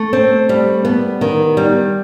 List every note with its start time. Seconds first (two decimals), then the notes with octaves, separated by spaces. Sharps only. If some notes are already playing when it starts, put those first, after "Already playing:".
Already playing: A3
0.13 C4
0.49 G3
0.85 B3
1.21 D#3
1.57 G3